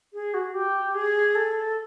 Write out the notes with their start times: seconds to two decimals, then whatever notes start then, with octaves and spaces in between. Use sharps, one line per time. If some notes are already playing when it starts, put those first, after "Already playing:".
0.13 G#4
0.34 F#4
0.54 G4
0.94 G#4
1.35 A4